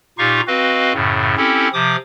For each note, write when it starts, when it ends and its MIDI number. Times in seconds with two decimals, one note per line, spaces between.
0.18 0.41 46
0.18 0.41 63
0.18 0.41 65
0.18 0.41 67
0.18 0.41 77
0.18 0.41 85
0.48 0.93 60
0.48 0.93 66
0.48 0.93 71
0.48 0.93 75
0.48 0.93 77
0.94 1.35 42
0.94 1.35 45
0.94 1.35 49
1.37 1.68 60
1.37 1.68 61
1.37 1.68 64
1.37 1.68 67
1.37 1.68 69
1.73 1.96 48
1.73 1.96 53
1.73 1.96 86
1.73 1.96 87